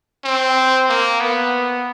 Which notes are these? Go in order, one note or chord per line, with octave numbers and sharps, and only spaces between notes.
C4
A#3
B3